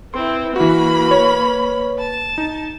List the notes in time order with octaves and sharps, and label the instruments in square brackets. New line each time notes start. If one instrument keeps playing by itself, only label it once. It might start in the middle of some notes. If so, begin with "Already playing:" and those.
[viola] C4 E4 [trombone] B4 [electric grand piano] C6
[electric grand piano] E3 F#4 [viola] A#3 B5
[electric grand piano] C#5
[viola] A5
[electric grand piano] D#4